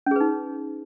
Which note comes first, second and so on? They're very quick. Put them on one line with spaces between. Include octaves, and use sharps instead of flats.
C#4 G#4 B4 D#4